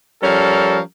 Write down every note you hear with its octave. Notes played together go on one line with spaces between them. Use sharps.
F3 G3 C#4 A4 A#4